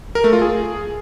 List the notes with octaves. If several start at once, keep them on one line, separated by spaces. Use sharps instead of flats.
A#4
A3
F4
G#4